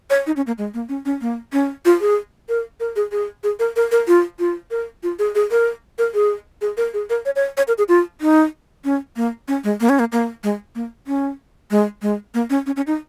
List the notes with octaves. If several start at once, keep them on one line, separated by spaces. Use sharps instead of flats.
C#5
D#4
C#4
A#3
G#3
A#3
C#4
C#4
A#3
C#4
F4
G#4
A#4
A#4
G#4
G#4
G#4
A#4
A#4
A#4
F4
F4
A#4
F4
G#4
G#4
A#4
A#4
G#4
G#4
A#4
G#4
A#4
C#5
C#5
C#5
A#4
G#4
F4
D#4
C#4
A#3
C#4
G#3
A#3
C#4
A#3
A#3
G#3
A#3
C#4
G#3
G#3
A#3
C#4
C#4
C#4
D#4